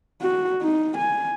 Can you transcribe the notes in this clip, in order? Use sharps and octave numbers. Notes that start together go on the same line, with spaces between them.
F#4
D#4
G#5